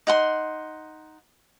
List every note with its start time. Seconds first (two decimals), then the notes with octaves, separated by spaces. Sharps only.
0.07 D#4 F#5 C6